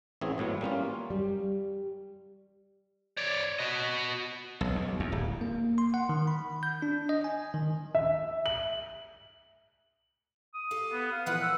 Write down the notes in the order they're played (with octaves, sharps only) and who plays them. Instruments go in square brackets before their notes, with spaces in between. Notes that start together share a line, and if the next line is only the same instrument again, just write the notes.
[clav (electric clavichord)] A1 E3 C4 C#4 G#4
G#1 A2 F#3 B3
G3 A#3 C#4 F4
[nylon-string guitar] G3
[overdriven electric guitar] C#5 D5
F#4 D#5
[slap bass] B1
D#2
E2
D1
[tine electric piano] A#3
C6
F#5
D#3
B5
G6
D4
D#5
G#5
D#3
[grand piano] E5
F#7
[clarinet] D#6
[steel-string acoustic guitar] G4 A4 F5
[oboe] B3
F5
[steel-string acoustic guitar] A#2 E3 F3 [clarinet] B4 [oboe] F#5
[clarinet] E6